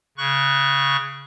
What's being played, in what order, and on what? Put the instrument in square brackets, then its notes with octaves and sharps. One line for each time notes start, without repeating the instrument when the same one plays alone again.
[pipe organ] C#3 C#6 F#6